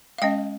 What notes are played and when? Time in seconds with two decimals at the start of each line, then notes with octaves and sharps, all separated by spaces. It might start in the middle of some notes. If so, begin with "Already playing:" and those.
0.18 F5
0.22 G#3 C#4 D#5 G5